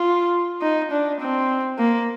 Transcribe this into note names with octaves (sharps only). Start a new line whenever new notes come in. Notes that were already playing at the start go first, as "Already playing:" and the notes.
Already playing: F4
D#4
D4
C4
A#3